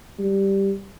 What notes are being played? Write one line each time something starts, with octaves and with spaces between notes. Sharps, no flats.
G3